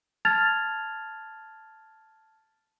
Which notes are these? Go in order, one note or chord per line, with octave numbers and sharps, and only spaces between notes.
A5 F6 G#6 A6 F7